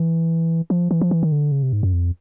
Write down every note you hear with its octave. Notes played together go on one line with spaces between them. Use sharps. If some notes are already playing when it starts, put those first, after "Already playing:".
Already playing: E3
F3
E3
F3
E3
D#3
D3
C#3
C3
G#2
F#2
F2